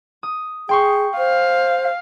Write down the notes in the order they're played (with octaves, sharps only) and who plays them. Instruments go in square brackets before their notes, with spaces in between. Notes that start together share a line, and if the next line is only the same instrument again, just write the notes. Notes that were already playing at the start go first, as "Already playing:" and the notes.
[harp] D#6
[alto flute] G#4 [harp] G5 C6 C#6
[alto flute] C5 [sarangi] F5